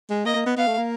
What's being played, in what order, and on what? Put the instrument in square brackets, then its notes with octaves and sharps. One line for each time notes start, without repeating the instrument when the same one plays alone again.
[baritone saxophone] G#3
[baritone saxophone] A#3 [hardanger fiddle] D#5
[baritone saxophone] A#3
B3
[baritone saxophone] B3 [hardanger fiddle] F5
[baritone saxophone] A3
A#3